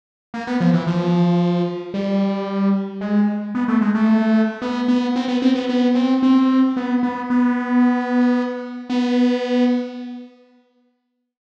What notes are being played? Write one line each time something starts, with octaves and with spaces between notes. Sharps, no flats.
A#3
B3
F3
E3
F3
G3
G#3
B3
A3
G#3
A3
B3
B3
C4
B3
C4
B3
B3
C4
C4
B3
B3
B3
B3